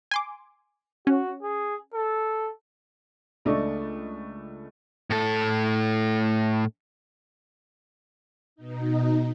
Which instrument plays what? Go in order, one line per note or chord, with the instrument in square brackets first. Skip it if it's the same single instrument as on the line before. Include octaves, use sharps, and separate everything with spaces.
[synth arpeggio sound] G#5 C6 D6
[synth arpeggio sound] C#4 [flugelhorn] F#4
[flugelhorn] G#4
A4
[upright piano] C#2 A3 D4 D5 D#5 C#6
[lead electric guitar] A2 A4
[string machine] B2 D#4